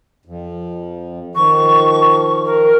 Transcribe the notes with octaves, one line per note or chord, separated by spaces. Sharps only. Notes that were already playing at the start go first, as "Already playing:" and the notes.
F2
D#3 F3 C#6
A#4